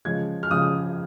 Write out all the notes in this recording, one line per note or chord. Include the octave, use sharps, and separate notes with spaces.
C#3 F3 G#3 G#6
F6
C#3 F3 G#3 D#6